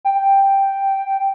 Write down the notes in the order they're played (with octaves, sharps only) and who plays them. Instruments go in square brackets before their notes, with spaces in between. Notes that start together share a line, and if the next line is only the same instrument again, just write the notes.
[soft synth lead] G5